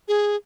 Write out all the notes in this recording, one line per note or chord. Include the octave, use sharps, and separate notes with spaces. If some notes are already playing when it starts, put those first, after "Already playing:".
G#4